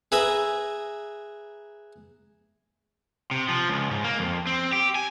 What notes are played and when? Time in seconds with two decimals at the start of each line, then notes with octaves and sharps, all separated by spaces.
0.12 G#4 B4 E5 A#5
3.31 C3
3.49 F3
3.68 C#2
3.91 G#2
4.04 A#3
4.19 F2
4.47 C4
4.73 G4
4.95 G#5